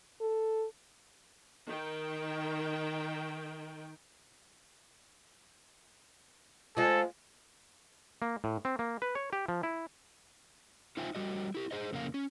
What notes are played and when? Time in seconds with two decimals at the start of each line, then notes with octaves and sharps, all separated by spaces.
0.21 A4
1.68 D#3 G5
6.77 F3 G#3 A4
8.22 A#3
8.44 A2
8.65 C4
8.79 A#3
9.02 B4
9.15 C#5
9.33 G4
9.48 F3
9.63 E4
10.97 D#4 F4 C5 E5 G5 G#5
11.15 G3 F#4 D#5
11.55 E4 G4
11.71 G#4 C5 D#5
11.93 F2 C#3 A#3 F#4 F5
12.14 C#4